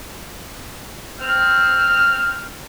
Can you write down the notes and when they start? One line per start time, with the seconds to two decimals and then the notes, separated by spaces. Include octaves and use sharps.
1.20 C4 F6